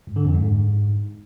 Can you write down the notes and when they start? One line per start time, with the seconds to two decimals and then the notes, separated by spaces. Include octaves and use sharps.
0.07 G#2
0.16 D3
0.25 F2
0.34 G#2